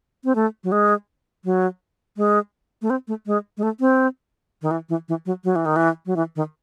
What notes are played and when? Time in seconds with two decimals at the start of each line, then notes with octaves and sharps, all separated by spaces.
0.24 C4
0.35 A3
0.64 F#3
0.72 G#3
1.45 F#3
2.17 G#3
2.82 A3
2.90 C4
3.08 A3
3.26 G#3
3.57 G#3
3.63 A3
3.80 C4
4.62 D#3
4.71 E3
4.89 E3
5.08 E3
5.26 F#3
5.44 F#3
5.56 E3
5.66 D#3
5.76 E3
6.06 F#3
6.16 E3
6.36 D#3